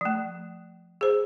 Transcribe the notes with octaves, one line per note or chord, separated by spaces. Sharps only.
F3 A3
G#4 C5